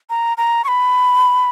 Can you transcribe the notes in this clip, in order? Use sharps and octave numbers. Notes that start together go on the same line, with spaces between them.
A#5
A#5
C#6
B5